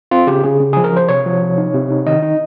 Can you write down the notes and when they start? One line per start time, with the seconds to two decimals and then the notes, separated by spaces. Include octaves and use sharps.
0.11 C4 F4
0.27 C#3 G4
0.44 C#3 G#4
0.60 C#3
0.73 F3 G#4
0.84 A#4
0.92 F3 C5
1.09 C3 C#5
1.26 F3
1.42 C3
1.58 D#4
1.74 C3
1.91 D#4
2.07 D#3 D#5
2.22 D#4